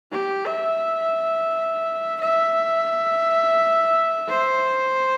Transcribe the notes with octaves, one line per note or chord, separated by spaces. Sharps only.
G4
E5
E5
C5